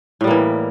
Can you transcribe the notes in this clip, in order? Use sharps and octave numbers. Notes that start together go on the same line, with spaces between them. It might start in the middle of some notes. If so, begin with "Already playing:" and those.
A2 E3 G3 A#3